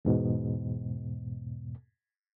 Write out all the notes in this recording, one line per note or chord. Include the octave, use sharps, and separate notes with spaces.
E2 G#2 B2